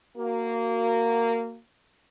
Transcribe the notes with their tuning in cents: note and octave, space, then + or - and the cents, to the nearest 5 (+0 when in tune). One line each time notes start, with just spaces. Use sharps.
A#3 -15 F#4 +0